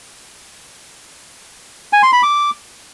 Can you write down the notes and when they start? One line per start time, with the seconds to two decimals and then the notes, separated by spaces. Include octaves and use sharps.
1.93 G#5
2.03 C6
2.13 B5
2.23 D6